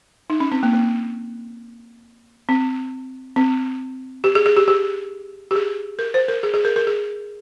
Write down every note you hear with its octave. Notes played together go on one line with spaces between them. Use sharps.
D#4
C#4
C4
A#3
A#3
C4
C4
G4
G#4
G#4
G4
G4
G4
G#4
A#4
C5
A#4
G#4
G#4
A#4
A#4
G#4